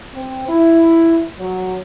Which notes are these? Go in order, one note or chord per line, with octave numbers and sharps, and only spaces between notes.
C4
E4
F#3